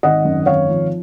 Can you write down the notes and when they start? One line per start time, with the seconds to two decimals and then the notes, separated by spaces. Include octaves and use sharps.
0.03 G#1 D#5 F#5
0.25 F#2
0.46 G#1 C#5 F5
0.69 F3